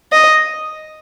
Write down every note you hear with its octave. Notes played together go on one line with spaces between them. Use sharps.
D#5